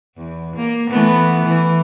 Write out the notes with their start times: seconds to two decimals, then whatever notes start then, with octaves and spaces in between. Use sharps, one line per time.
0.17 E2
0.56 A#3
0.90 E3 A3 B3
1.44 E3